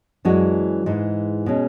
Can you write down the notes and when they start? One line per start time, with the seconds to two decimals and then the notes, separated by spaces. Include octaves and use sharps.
0.25 F#2 E3 G#3 D4 F#4
0.86 G#2 E3 G#3
1.46 B2 G#3 C#4 G#4